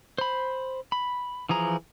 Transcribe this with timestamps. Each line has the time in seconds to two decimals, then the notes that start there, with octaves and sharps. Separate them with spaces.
0.18 C5 B5
0.92 B5
1.49 E3 F3 G#4 A#5